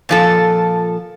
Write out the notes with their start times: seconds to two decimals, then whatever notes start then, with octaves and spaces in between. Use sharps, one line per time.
0.09 A#2 F3 A4